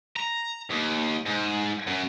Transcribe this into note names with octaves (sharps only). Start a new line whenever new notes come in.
A#5
D#2
G#2
F#2